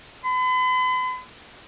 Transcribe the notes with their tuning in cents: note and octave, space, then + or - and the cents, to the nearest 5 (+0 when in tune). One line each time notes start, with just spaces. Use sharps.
B5 +45